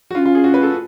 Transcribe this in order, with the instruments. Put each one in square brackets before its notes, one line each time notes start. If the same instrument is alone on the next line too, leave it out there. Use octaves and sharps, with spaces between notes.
[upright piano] F#4
[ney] D4 [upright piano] F4
[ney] C#4
[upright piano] F4
G#4
F#4
B4
A4